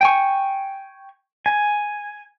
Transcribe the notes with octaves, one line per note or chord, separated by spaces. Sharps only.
G5 G#5 C#6
G#5